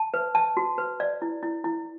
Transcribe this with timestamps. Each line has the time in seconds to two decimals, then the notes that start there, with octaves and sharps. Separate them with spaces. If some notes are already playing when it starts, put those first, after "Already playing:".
Already playing: A5
0.14 B4
0.35 A5
0.57 F#4
0.78 B4
1.00 D5
1.22 E4
1.43 E4
1.64 E4